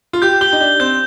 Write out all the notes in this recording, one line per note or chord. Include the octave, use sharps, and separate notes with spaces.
F4
G4 G6
G4 G7
D#4
D4 G7
C4 G6